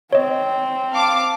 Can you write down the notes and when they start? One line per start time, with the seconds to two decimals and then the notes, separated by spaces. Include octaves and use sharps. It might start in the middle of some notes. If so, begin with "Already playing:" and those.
0.13 C4 C#5 D#5
0.93 F5 A5 D6